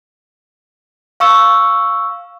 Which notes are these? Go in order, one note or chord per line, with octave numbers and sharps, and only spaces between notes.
F5 C#6 E6